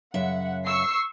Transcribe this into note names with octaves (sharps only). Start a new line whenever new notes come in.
F#2 C#3 E5 F#5
C#6 E6 C7